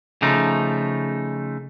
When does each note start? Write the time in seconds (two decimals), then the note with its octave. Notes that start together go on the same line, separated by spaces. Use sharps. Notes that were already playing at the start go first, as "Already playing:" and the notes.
0.22 C#3 F3 A3 D#4